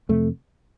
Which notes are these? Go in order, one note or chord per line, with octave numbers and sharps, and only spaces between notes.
F2 C3 A3